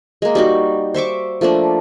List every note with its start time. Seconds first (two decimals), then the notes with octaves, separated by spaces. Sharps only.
0.22 G#3 A#3
0.35 G3 D#4 F#4
0.94 C5 E5 C#6 D6
1.41 F3 A3 A#3 D4